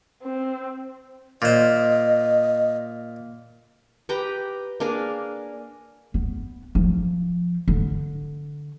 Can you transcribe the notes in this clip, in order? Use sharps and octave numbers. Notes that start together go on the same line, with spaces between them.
C4
A#2 C5 D#5
G4 B4 G5 A#5
A#3 D4 G#4 A#4
B3
F3
D3